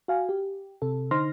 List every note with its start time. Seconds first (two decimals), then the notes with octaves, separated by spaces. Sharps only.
0.08 F#4 F5 G#5
0.29 G4
0.82 C3 A4
1.11 D3 D#4 C5 C6 F6 A#6